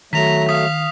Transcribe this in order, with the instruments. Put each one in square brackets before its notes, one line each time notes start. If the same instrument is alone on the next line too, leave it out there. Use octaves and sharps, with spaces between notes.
[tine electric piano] D#3 [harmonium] F#3 A3 [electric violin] A#5 [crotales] B6 F7
[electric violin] F5 [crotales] D#6 B6